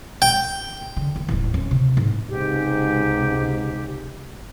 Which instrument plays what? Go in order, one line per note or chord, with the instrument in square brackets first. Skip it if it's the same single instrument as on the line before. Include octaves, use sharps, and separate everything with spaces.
[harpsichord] G5
[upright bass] D3
D#2
D#1 A1
D1 C#4
C3
G#2
[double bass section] C#2 C3 [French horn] G#2 [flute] G4